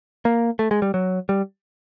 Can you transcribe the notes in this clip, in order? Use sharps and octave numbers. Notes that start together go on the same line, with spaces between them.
A#3
A3
G#3
G3
F#3
G3